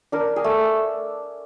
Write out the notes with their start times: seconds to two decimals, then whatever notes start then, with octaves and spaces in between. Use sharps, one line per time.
0.12 D4 A#4
0.36 G#4
0.44 A3